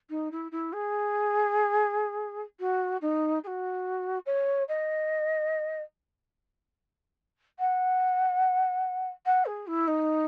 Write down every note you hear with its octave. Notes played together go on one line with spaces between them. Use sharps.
D#4
E4
E4
G#4
F#4
D#4
G#4
F#4
C#5
D#5
F#5
F#5
G#4
E4
D#4